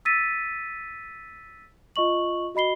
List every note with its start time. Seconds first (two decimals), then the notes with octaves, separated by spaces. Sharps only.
0.05 E6 A6 B6 D#7
1.96 F4 D#5 C#6 F#7
2.55 F#4 D#5 B5 C7 G7